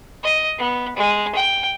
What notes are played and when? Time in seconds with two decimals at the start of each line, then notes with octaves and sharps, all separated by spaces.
0.23 D#5
0.59 B3
0.96 G#3
1.35 G5